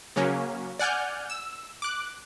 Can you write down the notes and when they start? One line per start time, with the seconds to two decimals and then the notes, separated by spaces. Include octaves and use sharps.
0.16 C#3 F#3 A#3 C#4
0.79 D5 F#5 G#5 F6 G6
1.30 E6
1.82 D6 F#6